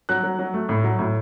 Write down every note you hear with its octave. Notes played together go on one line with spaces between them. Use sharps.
F#3 F#6
F#3
F#3
A3
A2
F#3
A2